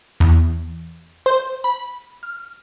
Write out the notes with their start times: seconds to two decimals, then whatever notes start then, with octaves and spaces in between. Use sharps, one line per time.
0.20 E2
1.26 C5
1.64 B5
2.23 F6